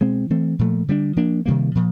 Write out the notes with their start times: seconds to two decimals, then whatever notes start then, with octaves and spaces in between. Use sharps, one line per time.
0.01 B2 G#3 C4
0.30 E3 A3 C4
0.59 A#2 F3 A3
0.88 D3 G3 B3 D4
1.16 F3 A#3 D4
1.46 C3 D#3 G3 A#3
1.75 A#2 F3